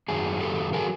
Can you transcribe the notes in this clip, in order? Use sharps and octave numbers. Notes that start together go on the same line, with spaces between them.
F#2 D#3 F#3 G#4
G4 A4
D#3 F#3 G#4 A#4